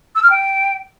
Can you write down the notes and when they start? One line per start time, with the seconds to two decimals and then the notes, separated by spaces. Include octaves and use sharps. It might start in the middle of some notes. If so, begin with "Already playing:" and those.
0.15 E6
0.23 F6
0.30 G5